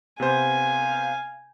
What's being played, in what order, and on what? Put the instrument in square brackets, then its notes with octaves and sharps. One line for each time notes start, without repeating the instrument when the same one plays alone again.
[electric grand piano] C3 B3 C5 [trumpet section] F5 [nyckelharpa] G#5